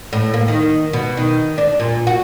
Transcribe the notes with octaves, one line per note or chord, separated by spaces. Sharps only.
A2
A#3
D#3
B2
D#3
D4
A#2
F#4